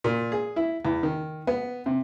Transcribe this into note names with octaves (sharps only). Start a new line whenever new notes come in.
A#2
G#4
E4
E2
D#3
B3
C3